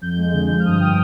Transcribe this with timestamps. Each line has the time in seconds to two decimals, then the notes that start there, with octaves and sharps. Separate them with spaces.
0.01 F2 G6
0.17 G#3
0.33 D3
0.49 F3 G6
0.60 F6
0.65 G2 D#6
0.80 F3 G5